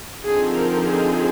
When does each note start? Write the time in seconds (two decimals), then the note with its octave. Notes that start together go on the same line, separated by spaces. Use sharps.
0.24 D3 F3 C4 D#4 G#4
0.55 A#4
0.85 G#4